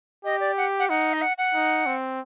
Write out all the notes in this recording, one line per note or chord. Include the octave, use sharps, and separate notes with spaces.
G4 D#5
D5
F#5
F#5
D#4 F#5
D#5
F#5
F#5
D#4
C4